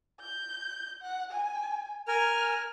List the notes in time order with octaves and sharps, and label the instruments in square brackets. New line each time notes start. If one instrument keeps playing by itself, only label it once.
[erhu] G6
F#5
G#5
[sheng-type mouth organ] A#4 G#5 [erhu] F6